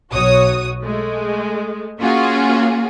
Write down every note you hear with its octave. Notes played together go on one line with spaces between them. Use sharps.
B1 F#4 C#5 D#6
G#3 A3
A#3 C#4 F4 F#4 G#4